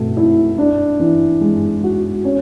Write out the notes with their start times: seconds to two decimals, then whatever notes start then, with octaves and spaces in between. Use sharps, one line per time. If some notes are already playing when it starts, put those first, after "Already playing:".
Already playing: B2 A3
0.17 E4
0.58 D4
1.00 E3
1.41 G#3
1.84 F#4
2.24 C#4